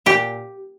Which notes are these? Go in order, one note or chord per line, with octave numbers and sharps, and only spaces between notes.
A#2 G4